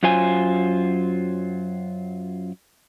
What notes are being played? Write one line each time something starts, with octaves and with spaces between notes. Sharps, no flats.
F#2 F#3 F4 C5 G#5